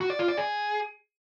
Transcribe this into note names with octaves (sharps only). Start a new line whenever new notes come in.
F#4
D5
F4
D5
G#4